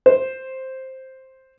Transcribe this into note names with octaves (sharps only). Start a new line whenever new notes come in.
C5